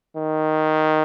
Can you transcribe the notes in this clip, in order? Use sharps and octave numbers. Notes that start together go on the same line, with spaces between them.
D#3